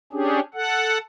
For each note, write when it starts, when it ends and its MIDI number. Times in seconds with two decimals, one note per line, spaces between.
0.13 0.40 61
0.13 0.40 62
0.13 0.40 67
0.13 0.40 68
0.54 0.98 69
0.54 0.98 78